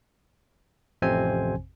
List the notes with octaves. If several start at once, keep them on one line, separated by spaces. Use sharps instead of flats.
A1 F2 C3 C4 C5 G#5